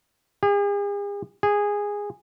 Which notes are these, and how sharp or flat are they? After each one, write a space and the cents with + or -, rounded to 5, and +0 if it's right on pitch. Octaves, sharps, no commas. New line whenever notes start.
G#4 -45
G#4 -15